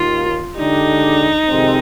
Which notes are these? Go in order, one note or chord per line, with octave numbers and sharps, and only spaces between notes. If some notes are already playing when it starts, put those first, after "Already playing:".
Already playing: D#2 D#3 A#3 F4
D3 G#3 D4 D#4 G4
F2 C3 D#3 G#3 C4